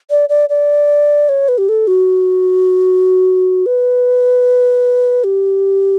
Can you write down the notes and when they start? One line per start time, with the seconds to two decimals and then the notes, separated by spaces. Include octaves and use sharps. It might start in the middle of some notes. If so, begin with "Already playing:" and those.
0.10 D5
0.29 D5
0.49 D5
1.29 C#5
1.48 B4
1.58 G4
1.69 A4
1.87 F#4
3.66 B4
5.24 G4